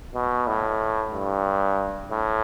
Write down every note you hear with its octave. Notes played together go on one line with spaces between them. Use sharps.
B2
A2
G2
A2